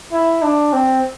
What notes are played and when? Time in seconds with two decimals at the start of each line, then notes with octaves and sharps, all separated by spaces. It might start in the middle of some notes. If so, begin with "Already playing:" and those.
0.12 E4
0.43 D4
0.73 C4